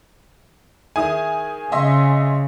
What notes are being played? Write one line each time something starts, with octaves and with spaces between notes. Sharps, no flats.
D#3 E4 G#4 G#5 D#6
C#3 D#5 E5 C6